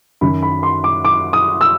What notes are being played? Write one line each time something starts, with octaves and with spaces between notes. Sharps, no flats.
F#2 D#3 F#3 B5
B5
C6
D6
D6
D#6
E6